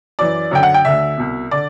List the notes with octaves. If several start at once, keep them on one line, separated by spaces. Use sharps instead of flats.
F#2 E3 D5
F#2 D3 G5
F#5
G5
D2 D3 E5
C2 B2
D3 D5